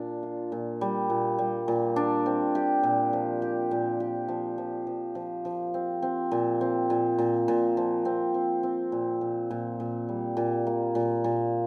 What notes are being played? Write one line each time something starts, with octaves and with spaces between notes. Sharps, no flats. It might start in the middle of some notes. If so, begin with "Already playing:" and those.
Already playing: A#2 D4
F4
A#2
G3
A#2
G3
A#2
D4
C4
G4
A#2
F3
G4
A#2
G4
F3
F3
F3
F3
F3
C4
C4
A#2
C4
A#2
A#2
A#2
F3
C4
C4
C4
A#2
A#2
A#2
A#2
G3
A#2
A#3
A#2
A#2